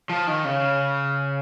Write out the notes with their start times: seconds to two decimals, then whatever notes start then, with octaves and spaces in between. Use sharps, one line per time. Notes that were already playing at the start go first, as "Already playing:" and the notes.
0.10 F3
0.27 D#3
0.45 C#3